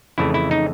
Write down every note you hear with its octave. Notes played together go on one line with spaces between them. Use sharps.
F2 C#3 E3 A3 E4
E4
D#4